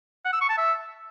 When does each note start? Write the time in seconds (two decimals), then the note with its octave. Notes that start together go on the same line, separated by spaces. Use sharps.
0.25 F#5
0.33 E6
0.41 C#6
0.49 A5
0.57 E5